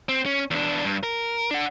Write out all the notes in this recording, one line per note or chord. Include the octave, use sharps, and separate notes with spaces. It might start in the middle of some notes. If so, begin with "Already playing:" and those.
C4
C#4
E2 D4
G2
A#4
D4 F#5